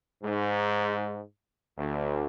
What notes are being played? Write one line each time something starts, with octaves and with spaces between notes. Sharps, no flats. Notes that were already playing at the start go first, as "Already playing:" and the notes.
G#2
D2